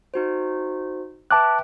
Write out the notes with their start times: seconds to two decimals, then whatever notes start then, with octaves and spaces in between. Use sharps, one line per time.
0.14 D#4 F#4 C5
1.31 B4 E5 G5 A5 D6 F#6